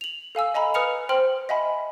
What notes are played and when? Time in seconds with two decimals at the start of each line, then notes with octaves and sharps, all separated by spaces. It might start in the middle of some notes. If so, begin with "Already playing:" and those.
0.01 F7 F#7
0.35 A4 F5 G#5 E6
0.54 D#5 G#5 A#5 B5
0.74 B4 D#6 F6 C#7 F7
1.09 C5 G5 C6 F6 F#7
1.49 D#5 E5 F#5 G#5 B5